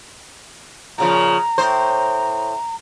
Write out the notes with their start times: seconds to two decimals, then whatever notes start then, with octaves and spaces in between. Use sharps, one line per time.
0.98 A#2 C#3 F3 A#5
1.58 A2 C5